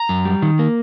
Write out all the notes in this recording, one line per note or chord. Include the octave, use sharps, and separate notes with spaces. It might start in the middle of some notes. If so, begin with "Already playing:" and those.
Already playing: A#5
F#2
G3
D#3
A#3